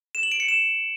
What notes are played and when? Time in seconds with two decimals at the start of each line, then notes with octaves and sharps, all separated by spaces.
0.15 E7
0.23 F#7
0.32 D7
0.40 C#7
0.48 E7